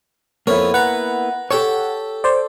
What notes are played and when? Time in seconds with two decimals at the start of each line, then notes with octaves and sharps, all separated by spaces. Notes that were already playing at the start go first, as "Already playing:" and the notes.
0.47 F2 A#3 B3 E4 C#5
0.74 B4 F#5 A#5
1.51 G4 A4 C#5 G5 A5
2.24 C5 D5